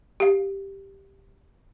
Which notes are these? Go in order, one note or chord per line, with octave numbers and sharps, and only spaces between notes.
G4 F5